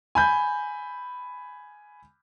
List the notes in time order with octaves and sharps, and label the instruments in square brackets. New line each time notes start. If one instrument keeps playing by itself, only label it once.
[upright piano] G#5 B5 G6